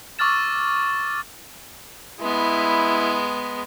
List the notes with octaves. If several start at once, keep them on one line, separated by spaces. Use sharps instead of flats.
C#6 D6 E6 F6 A6 E7
G#3 B3 E4